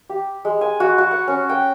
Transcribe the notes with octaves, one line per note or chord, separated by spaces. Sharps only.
G4
G#3
G#5
F#4
F#4
F#5
C#4
G5